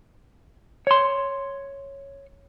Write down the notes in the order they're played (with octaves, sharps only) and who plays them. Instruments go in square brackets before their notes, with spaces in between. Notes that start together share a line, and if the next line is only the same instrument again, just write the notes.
[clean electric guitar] C#5 C6